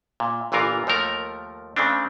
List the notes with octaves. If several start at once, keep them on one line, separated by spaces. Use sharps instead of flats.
A#2
G1 A#2 E3 F4 A#4 F5
D#2 F3 A3 A#4 A#5
C#3 A3 C4 D4